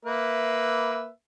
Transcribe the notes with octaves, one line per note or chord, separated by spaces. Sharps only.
A#3 B4 E5